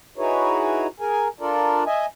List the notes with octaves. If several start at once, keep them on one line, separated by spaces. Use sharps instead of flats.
D#4 E4 F#4 G#4 B4 C#5
G#4 A#4 G#5
D4 F4 A4 A#4 D5
D#5 E5 G#5